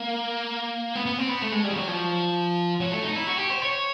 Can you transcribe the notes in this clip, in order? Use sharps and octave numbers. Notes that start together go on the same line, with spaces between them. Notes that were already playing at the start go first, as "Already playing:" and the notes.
Already playing: A#3
B3
B3
C4
B3
A3
G#3
G3
F3
F#3
F3
F#3
A3
D#4
E4
F#4
G4
C5
C#5